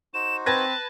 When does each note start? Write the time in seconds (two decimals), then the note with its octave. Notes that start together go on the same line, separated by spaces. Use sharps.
0.14 D#4 F#4 C5 E7
0.46 C4 B4 A5 G#6 A#6